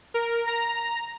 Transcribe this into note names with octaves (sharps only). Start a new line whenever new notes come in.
A#4
A#5